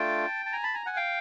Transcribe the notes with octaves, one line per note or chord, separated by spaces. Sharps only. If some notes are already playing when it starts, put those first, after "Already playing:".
Already playing: A3 D4 F4 G5 A5
A5
G#5 A#5
A5 B5
G#5 A#5
F#5 G#5
F5 G5